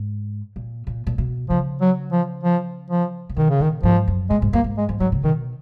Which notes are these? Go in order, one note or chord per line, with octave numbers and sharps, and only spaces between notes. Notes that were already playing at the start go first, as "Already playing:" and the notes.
Already playing: G#2
A#2
A#2
A#2
B2
C#3 F3
F#3
F3
F3
F3
A#2
B2 D#3
C#3
A#2 D#3
G#2 F3
F#2
A#2 G#3
G#2
F#2 A#3
G#2
G#3
F3
D#3 F#3
C#3
B2 D#3